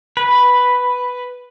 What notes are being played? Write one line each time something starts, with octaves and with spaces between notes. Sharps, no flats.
B4